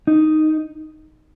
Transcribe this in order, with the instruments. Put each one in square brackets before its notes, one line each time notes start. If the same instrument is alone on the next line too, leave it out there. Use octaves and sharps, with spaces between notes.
[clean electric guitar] D#4